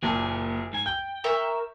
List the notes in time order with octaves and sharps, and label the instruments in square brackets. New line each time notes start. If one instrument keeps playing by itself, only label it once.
[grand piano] F#1 A#2 A5 [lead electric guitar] G4 G#4
[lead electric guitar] G#2 G#5
[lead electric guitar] G5 [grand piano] G6
[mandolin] A#4 E5 C#6